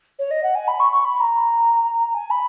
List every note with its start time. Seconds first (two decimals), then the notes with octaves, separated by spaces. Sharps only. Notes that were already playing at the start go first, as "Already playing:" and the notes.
0.19 C#5
0.31 D#5
0.43 F#5
0.55 G#5
0.68 B5
0.80 C#6
0.92 C#6
1.05 B5
1.17 B5
1.20 A#5
2.14 G#5
2.31 B5